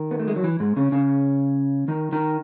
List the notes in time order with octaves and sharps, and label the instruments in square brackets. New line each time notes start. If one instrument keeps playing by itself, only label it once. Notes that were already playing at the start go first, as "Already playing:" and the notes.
Already playing: [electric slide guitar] D#3
B3
A3
G#3
F#3
E3
G#2 G#3
C#3 C#4
C#3 C#4
D#3 D#4
D#3 D#4